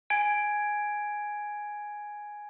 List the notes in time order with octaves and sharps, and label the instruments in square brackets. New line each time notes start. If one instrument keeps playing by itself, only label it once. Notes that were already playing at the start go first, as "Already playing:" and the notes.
[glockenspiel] G#5 G#6 D7